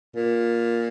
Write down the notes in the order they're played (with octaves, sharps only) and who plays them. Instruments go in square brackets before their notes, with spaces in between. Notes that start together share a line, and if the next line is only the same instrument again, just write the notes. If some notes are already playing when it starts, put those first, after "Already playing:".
[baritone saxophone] A#2